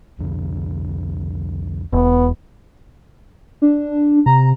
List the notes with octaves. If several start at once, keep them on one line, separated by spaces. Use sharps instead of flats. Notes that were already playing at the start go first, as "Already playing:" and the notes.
C2 F2 D3
E1 B3
D4
C3 A#5